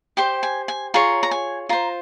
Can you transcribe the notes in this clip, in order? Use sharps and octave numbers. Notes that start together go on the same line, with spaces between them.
G4 C5 G5
G#5
G#5
F4 G#4 C#5 A#5
A#5
G#5
F4 C5 A#5